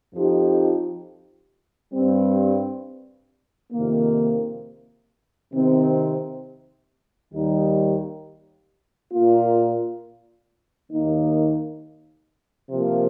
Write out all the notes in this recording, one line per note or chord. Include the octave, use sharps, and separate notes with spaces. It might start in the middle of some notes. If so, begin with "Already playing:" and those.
F2 F3 D#4 G4
G2 G3 C4
F2 C3 D#3 A#3
C3 D#3 C4
D#2 D#3 G3 D#4 G4
A#2 A#3 F4
D#2 D#3 A#3 D#4
C3 F3 A#3